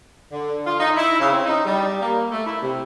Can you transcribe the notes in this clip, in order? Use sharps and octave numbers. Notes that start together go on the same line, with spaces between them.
D3
F4
D#4
E4
C#3
C4
D#4
G3
A#3
A3
E4
C3